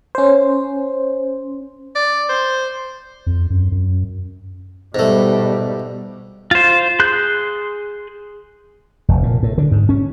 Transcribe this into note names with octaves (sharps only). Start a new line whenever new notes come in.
C#4 C5
D5
C5
F2
F#2
F#2
G#2 B2 G3 A3
F4 C5
G#4 C6 F#6 G6
F1
A#2
A2
D3
G#2
C#4